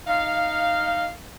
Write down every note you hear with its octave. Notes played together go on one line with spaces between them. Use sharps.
D#4 F5